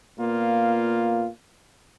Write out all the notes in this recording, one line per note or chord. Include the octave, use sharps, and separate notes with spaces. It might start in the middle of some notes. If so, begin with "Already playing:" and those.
A#2 A#3 B3 F4